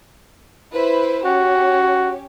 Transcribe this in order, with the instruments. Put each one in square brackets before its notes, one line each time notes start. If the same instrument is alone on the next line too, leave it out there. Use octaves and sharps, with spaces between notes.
[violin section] E4 B4 C5
[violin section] C#4 G4 C#5 [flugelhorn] F#4